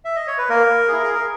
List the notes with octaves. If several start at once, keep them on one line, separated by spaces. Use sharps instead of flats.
E5
D#5
C#5
B4
A#3 A#4
E4 G#4
G#4
A#4